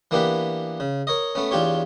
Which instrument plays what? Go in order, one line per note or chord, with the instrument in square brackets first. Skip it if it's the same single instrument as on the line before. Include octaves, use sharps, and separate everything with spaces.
[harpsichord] E3 A#3 B3 D4 G4 B4
C#3
A#4 C#5 D#5
A3 B3 C#4
E2 D4 F4 G4 C#5